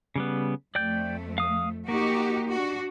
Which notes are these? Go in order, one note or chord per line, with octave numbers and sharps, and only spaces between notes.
C#3 G3 B3
F2 A3 D5 G5 G6
F5 D#6
A#3 D#4 F#4 G4
D4 F#4